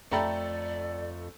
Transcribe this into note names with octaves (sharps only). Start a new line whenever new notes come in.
F2 A3 A4 D5 G5 A#5 B5